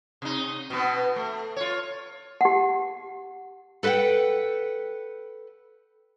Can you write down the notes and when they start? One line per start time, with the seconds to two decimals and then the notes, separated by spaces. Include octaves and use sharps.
0.22 C3 D#4
0.70 B2 B3
1.16 A3
1.56 F4 C#5
2.41 G4 F#5
3.83 A4 B4 D#5 F#5 G5